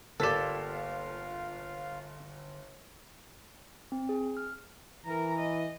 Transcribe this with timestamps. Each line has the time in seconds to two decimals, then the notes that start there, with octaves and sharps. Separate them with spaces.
0.20 G1 A#3 F4 G4 A4 D5 B6 E7
3.92 C4
4.09 G#4
4.37 F6
5.05 E3 A#4 A#5
5.38 D#5